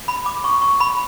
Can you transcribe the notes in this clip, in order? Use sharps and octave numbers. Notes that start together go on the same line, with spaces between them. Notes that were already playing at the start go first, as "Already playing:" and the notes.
B5
D6
C#6
C#6
B5